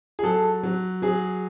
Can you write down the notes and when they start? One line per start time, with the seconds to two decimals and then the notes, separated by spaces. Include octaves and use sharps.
0.19 G#4
0.23 F#3 A4
0.63 F#3
1.02 F#3 G#4